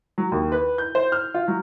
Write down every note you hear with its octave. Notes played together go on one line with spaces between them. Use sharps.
F#3
D#2
B4
G6
C5
F6
F4
F#3